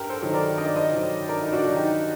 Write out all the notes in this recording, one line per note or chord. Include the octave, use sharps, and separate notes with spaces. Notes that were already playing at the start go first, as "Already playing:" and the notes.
Already playing: G2 G4 A#4
A4 C5
D#3 F#3
A#4 D5
G2 D#5
D5
C5 D#5
D#3 F#3
G2 A#4 D5
D#4
D4 F#4
D#3 F#3
D#4 G4